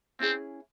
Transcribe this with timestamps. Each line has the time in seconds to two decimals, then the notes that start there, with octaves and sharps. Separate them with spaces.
0.20 C4 C#4 E4 G#4